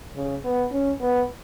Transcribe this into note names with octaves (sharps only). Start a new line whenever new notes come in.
C#3
B3
C#4
B3